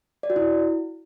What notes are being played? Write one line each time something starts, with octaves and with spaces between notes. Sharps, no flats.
D5
F#4
E4